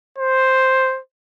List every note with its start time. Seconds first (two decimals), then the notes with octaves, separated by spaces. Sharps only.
0.19 C5